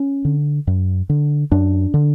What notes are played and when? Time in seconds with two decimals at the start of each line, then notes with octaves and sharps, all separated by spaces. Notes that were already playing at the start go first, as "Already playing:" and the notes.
Already playing: C#4
0.25 D3
0.67 F#2
1.09 D3
1.52 F#2 D4
1.94 D3